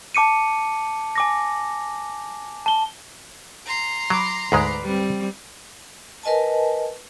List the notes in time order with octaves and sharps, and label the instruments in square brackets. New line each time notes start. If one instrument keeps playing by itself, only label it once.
[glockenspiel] A5 D6 C#7 D#7
G#5 D6 A#6
A5 G7
[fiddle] A#5 C6
[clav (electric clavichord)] F#3 [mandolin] B5 D6
[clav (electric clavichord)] D2 G#2 G#3 [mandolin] B4 D5 F5
[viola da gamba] G3 C4
[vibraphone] A#4 B4 D#5 G#5 A5